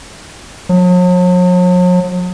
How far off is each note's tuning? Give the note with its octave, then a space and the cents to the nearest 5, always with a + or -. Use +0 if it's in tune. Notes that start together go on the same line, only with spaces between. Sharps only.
F#3 -45